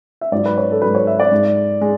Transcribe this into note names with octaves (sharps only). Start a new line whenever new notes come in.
E5
G#2 F#3 D5
B4
C#5
A4
G#2 F#3 B4
C#5
E5
D5
G#2 G#3
G#3